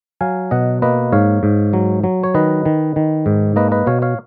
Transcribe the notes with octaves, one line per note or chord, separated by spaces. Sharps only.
F#3 F5 G#5
B2 D#5 F#5
A#3 B4 D#5
G#2 C#5 F5
G#2
F#3
F#3
C#5
D#3 B4 D#5
D#3
D#3
G#2
A#3 B4 D#5
B4 D#5
B2 C#5 F5
C#5 F5